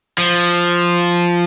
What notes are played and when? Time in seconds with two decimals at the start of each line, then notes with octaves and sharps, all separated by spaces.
0.18 F3